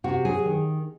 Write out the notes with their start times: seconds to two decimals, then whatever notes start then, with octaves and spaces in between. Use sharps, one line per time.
0.04 C3 F#4
0.25 F#3 G#4
0.45 D#3